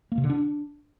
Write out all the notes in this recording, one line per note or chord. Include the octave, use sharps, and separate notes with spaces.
A#3
C3
D3
D4